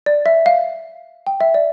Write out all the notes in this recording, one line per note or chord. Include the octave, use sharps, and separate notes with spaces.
D5
E5
F5
G5
E5
D5